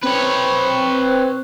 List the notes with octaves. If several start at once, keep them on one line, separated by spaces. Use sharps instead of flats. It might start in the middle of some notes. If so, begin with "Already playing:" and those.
C4 B4 C#5